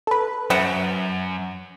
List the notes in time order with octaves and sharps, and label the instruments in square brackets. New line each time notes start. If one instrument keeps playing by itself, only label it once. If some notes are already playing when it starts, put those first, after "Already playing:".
[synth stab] A4 B4
[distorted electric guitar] F#2 [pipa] E5 F#5